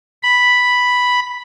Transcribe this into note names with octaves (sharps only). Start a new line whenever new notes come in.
B5